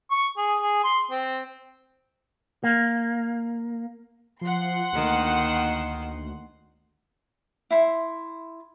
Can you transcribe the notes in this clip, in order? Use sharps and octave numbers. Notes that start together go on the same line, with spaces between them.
C#6
G#4
G#4
C6
C4
A#3
F3 F#5 C6
D2 D#3 A#3
E4 C6